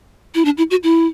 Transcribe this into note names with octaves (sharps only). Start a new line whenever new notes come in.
E4
D4
E4
F#4
E4